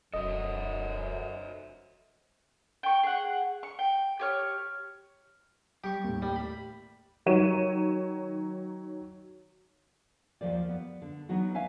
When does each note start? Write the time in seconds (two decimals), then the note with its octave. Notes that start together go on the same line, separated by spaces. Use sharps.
0.14 E1 F#2 A4 C5 D#5 E5
2.83 G5 C#6
3.03 G#4 F#5
3.63 C#6
3.79 G5
4.19 G4 C#5 F6
5.84 G3 G4 C#6
6.04 D#2 A2
6.22 G3
6.36 B5
7.26 D#3 F#3 C#5 D#7 E7
10.41 D#2 B2 F3 C5 D5
10.69 B3
11.02 D3
11.29 E3 F#3 B3 D#4 F#4
11.54 B4 C5 E5 F5 G#5